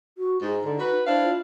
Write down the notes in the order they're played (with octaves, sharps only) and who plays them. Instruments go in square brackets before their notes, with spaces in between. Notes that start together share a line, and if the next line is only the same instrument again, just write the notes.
[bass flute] F#4
[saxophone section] G#2 [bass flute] D#4
[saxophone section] D3
F#4 B4
[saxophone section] D4 E4 F5 [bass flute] C5
[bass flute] F4